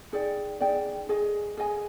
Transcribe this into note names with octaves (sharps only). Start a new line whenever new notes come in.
D#4 G#4 D5 G5
D#4 G#4 D5 G5
G#4 D#5 G#5
G#4 D#5 G#5